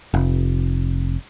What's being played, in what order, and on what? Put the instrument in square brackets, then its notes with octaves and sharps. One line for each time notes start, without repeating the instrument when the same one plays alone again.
[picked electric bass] F1